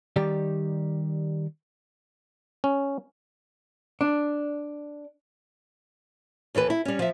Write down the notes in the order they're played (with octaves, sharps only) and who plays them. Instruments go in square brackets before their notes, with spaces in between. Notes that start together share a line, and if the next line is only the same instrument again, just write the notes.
[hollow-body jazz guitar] D#3 G3 G4 D5
[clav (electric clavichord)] C#4
[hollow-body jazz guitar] D4
[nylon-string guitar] D#2 E3 A4 B4
E4
G3 C#4
F3 E5